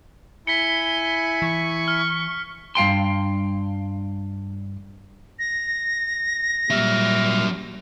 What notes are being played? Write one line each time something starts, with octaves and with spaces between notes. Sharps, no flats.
E4 G#5 B5 B6 C#7 G7
E3 C#6
F6
G2 F5 G5 C6
A#6
A#2 F#3 G3 E5 F6